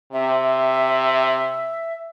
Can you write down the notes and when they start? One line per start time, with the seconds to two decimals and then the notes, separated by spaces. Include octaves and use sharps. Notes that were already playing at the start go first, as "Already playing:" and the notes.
0.13 C3 E5